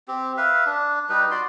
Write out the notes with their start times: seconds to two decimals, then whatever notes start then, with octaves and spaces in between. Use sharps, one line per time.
0.08 C4 G4
0.37 B4 E5 F5
0.66 D4
1.09 G3 D#4 B4
1.31 F#4 D5 C6